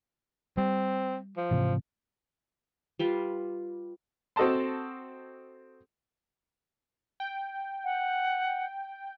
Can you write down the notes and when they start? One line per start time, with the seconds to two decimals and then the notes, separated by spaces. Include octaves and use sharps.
0.57 G3 C4
1.37 F3
1.51 G#2 C3 E3
2.99 G3 F4 B4
4.36 C4 F#4 A4 D#5 A5 C6
7.20 G5
7.84 F#5